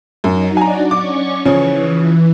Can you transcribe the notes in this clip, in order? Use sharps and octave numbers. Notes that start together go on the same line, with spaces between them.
F#2 F#3 D#4
D4 F#4 D5 G#5 A#5
C#4 C#6 D6
C#3 E3 F3 C#4